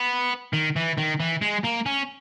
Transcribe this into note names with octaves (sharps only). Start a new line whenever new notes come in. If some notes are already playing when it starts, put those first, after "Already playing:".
Already playing: B3
D#3
E3
D#3
E3
G#3
A#3
C#4